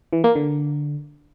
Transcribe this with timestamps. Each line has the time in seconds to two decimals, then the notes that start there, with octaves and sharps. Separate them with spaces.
0.13 E3
0.24 A#3
0.35 D3